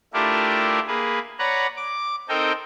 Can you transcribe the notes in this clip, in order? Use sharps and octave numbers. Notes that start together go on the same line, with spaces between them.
A3 D4 E4 F4 G4 A#4
A#3 G#4 B4
B4 C#5 D5 F#5 A#5
D6
C4 D#4 A4 A#4 D#5 G5